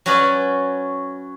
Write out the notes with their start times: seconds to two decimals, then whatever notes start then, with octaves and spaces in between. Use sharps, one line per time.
0.06 F#3 C#4 F#4 B4 D5